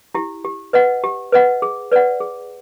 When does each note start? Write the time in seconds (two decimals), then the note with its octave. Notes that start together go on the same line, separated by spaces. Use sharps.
0.15 E4 G4
0.45 G4
0.73 B4 D#5 F#5
1.04 G4
1.32 B4 D#5 F#5
1.62 G#4
1.92 B4 D5 F#5
2.20 G#4